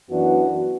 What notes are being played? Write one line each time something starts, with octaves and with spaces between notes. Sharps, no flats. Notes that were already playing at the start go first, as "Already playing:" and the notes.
F#2 E3 B3 D4 F#4